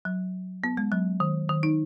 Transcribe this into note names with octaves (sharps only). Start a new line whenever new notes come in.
F#3
B3
G#3
F#3
D#3
D#3
D#4